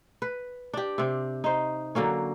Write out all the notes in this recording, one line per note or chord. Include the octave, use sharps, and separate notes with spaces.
B4
D4 G4
C3 C4
D#4 C5
D3 F#3 A#3 C#4